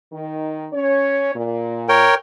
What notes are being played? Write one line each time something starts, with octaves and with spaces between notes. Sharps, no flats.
D#3
C#4 C#5
A#2
A#4 C#5 G5